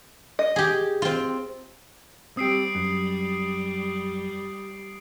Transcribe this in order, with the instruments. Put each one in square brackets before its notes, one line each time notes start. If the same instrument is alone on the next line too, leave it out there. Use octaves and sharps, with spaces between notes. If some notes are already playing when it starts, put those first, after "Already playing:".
[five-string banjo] D#5
[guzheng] G4 G#4
C4 F4
[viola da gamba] G3 [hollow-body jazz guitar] C4 G4 [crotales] D#6 C7 D7
[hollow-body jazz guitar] F#2